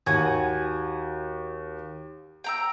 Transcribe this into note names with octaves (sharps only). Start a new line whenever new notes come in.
D#2 F#4 G#5
G5 A#5 E6